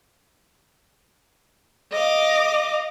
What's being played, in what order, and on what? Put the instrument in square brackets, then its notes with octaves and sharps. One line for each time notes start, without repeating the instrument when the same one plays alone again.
[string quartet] D#5 F5 D6